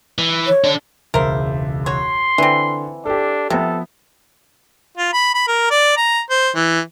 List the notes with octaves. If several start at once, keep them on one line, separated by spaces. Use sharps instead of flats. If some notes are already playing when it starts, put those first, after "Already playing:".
E3
C#5
D4 A4
E1 C#2 A#4 C5 E5
F#4 C#5 C6
D3 E3 C4
D4 G4 A4
C3 F3 B3 A4
F4
B5
B5
A#4
D5
A#5
C5
E3